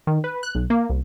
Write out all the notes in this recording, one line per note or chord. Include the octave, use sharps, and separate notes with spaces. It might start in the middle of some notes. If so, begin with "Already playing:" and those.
D#3
B4
F#6
B1
A#3
C2